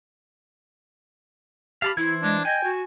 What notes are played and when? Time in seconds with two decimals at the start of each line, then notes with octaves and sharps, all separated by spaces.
1.82 G4 F5 A5 B5
1.97 E3 E4 C5 G#6
2.23 G#3 D4
2.45 D#5 G5 G#5
2.64 F#4